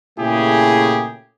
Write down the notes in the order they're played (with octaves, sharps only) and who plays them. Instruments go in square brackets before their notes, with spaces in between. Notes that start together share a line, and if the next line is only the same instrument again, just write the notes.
[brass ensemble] A#2 C#3 A3 E4 G4 G#4